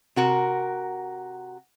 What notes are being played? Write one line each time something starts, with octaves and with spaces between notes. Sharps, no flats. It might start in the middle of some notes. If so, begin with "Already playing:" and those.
C3 F#4 A#4